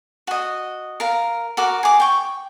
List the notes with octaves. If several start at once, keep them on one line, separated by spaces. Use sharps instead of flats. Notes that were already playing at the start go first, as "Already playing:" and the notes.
F#4 D#5
A#4 F5
F#4 A#4 D6
G#4 D6
G5 C#6